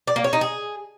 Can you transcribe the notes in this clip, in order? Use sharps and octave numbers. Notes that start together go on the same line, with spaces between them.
D5
A#3
C#5
D#4
G#4